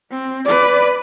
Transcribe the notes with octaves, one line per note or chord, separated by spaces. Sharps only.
C4
B4 D5